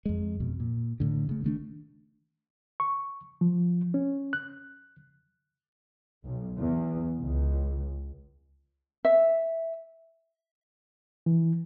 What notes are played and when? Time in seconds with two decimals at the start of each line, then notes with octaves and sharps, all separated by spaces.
0.06 F2 G#3
0.40 F2 B2
0.60 A#2
1.00 A2 D3
1.29 C#3 A3
1.44 D#3 A3 D4
2.80 C#6
3.41 F3
3.94 C#4
4.33 F#6
6.25 B1
6.57 E2
7.20 C#2
9.05 E5
11.26 E3